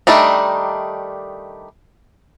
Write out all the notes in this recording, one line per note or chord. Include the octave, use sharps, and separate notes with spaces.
D#3 G3 A3 D4 D#4